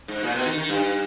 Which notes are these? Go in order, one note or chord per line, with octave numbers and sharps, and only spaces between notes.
G#2
A#2
B2
D#3
D#3
G2